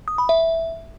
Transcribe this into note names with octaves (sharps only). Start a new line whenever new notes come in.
D#6
B5
E5